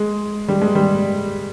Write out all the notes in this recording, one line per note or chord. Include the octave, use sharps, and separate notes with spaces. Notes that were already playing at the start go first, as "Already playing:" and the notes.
Already playing: G#3
G3
G#3
G3